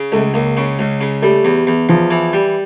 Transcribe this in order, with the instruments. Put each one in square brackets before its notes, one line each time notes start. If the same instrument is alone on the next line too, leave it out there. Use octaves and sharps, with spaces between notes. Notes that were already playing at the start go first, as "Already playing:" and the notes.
Already playing: [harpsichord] C#3
[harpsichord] C#2 [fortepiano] A3
[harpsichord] C#2 [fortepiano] A#3
[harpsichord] C#3
C#2
C#3
[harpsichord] G3 [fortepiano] A3
[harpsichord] E2
E2
[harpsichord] E2 [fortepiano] F3
[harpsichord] E3
G3